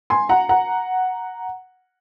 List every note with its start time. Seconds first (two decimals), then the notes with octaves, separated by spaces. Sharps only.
0.10 G#5 C6
0.29 F#5 A#5
0.49 F#5 A#5